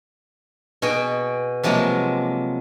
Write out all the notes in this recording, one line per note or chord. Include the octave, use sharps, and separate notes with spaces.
B2 F#4 G#4 G5
C3 F3 F#3 G#3 A#3